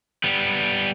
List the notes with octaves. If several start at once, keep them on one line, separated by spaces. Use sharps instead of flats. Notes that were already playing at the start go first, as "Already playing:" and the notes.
G3 B3